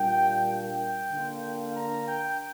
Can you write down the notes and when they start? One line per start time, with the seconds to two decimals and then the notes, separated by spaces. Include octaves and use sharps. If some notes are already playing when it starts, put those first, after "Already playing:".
Already playing: A#2 G3 A#3 D4 G5
0.49 G5
1.12 D3 A#3 D4 F4
1.75 A#5
2.07 G5